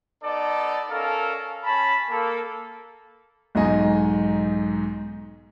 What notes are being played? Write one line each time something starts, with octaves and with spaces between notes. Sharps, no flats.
B3 D#4 A4 D5
C#4 A4 A#4 F5
C#4 A5 B5
A#3 A4
B1 G#2 D#4 D#5 G#5